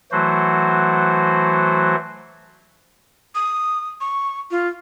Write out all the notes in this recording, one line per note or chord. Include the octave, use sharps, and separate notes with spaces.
E3 F#3 A3 F#4 C5
D#6
C#6
F4